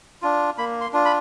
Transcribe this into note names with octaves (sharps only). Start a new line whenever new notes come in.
D4 F4
A#3 B5
C6
D4 F4
B5